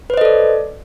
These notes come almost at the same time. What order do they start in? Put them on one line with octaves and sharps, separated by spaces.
B4 C5 D#5 A4 D5